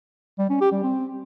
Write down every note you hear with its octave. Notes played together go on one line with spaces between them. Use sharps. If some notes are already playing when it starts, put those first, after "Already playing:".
G3
C#4
G4
G3
C4